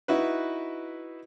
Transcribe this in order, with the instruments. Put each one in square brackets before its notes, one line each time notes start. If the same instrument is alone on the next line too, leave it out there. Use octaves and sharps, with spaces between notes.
[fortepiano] D#4 E4 F#4 B4